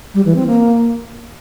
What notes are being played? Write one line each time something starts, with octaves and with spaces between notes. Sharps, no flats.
G3
E3
C4
A#3